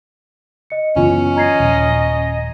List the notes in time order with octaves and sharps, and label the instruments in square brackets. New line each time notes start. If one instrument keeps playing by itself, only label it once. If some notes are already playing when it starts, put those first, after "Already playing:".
[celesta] D#5 C#7
[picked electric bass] F#1 E3 B3 [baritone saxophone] C#4 [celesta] F4
[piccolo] D#5 [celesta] A#5 G#6 C7
[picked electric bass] D#1 F3